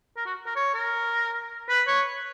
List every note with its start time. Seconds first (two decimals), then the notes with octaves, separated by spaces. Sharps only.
0.17 A#4
0.26 F#4
0.46 A#4
0.56 C#5
0.74 A#4
1.69 B4
1.87 C#5